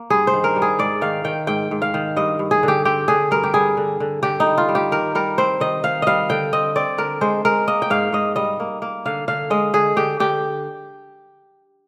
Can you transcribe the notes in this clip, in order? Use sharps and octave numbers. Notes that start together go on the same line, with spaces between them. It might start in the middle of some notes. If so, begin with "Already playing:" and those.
Already playing: A#3
G2 G#4
C5
D#3
A#4
G3
G#4
G#2 D5
D#3 F5
D#3 G5
G#2 G5
G#2
F5
D#3
G2 D#5
G2
G#4
D3
G4
C4 G4
D3 G#4
G2 A#4
G4
G3 G#4
D3
D3
D3 G4
D#4
G3
F4
G3
G4
D#3 A#4
G3 A#4
C4 C5
D#3 D#5
D#3 F5
G3 D#5 F5
D3 G5
C4 D#5
C4 D5
D3 A#4
G#3 C5
G#3 A#4
A#3 D#5
G5
G#2 F5
G#2 D#5
G3 D#5
A#3
A#3
D3 F5
D3 F5
G#3 D#5
D3 G#4
D3 G4
D3 G4